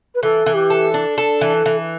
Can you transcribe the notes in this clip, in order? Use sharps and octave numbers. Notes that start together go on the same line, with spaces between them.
B4
E3 A4
E3
G4
A4
D4
A4
E3
E3